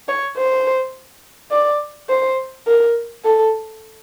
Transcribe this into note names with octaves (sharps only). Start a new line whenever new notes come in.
C#5
C5
D5
C5
A#4
A4